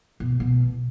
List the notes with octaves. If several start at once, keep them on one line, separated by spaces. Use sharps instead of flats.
B2
B2